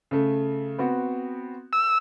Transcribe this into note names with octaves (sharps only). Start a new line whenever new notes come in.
C#3 A3
B3 C4 F#4
E6